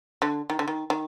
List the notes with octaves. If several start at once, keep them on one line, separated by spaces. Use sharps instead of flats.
D3
D#3
D3
D#3
D#3